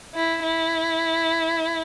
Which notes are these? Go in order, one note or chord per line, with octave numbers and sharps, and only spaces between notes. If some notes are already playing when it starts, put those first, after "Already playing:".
E4
E4